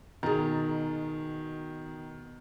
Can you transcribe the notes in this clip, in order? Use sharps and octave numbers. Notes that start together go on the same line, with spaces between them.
B2 D#3 G#4 A#5 A6